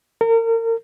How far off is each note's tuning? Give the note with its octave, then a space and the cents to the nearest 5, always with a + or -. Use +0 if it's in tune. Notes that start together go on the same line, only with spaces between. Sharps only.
A#4 -35